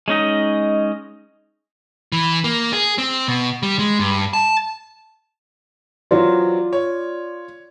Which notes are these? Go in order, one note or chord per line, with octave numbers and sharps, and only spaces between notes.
G#3 C#4 D#4 D#5
E3
A#3
G#4
C4
B2
G3
G#3
G2
A5
E3 F#3 C4 F4 D5
C#5